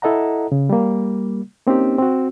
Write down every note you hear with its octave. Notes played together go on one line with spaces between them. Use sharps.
E4 A4 D#5 F#5 A#5
C#3
G3 A#3
A#3 C4 C#4 D#4 G4
C4 F#4